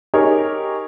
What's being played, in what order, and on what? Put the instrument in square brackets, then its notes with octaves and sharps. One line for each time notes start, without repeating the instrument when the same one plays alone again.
[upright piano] D#4 G4 G#4 A#4 C#5